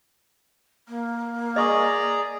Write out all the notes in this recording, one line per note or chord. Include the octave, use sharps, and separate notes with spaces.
A#3
G#4 D5 D#5 A#5 C#6 D#6